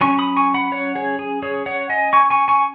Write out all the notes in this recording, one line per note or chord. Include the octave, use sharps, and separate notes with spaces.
F#3 C#4 G#5 C#6
B5 D#6
G#5 C#6
F#5 B5
C#5 F#5
G#4 C#5
G#4
G#4 C#5
C#5 F#5
D#5 G#5
G#5 C#6
G#5 C#6
G#5 C#6